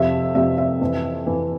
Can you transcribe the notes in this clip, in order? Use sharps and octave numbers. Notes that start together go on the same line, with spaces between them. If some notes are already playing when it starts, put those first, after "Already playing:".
Already playing: F2 C3 F3 E5
F2 C3 F3 E5
E5
F2 E3
F2 E3